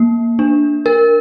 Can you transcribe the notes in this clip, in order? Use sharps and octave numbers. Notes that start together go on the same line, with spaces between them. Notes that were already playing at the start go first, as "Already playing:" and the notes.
Already playing: A#3
D4
A#4